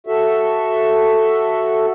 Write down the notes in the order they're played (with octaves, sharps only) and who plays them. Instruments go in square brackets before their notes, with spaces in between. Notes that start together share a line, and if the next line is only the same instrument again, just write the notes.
[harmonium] F#4 A4 E5